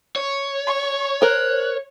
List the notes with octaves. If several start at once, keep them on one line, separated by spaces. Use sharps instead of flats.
C#5
C#6
A#4 C5 F#6